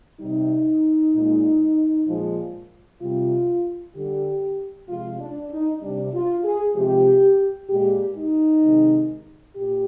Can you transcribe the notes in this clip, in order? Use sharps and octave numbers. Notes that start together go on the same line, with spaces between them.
C3 G3 D#4
A#2 G#3
A#2 F3 G#3
C3 G3 F4
D3 G3 G4
C3 F3 G#3 F4
D4
D#4
C3 G3 D4
F4
G#4
C3 F3 G#3 G4
A#2 G#3 G4
D#4
C3 D#3 G#3
A#2 G4